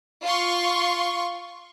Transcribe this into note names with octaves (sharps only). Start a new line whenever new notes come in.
F4 C6 C#6